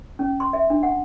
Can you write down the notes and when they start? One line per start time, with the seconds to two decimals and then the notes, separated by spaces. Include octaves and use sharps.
0.19 C#4
0.40 C6
0.53 E5
0.70 D4
0.83 F#5